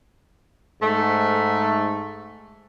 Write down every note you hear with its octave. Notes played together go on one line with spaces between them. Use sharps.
G#2 A3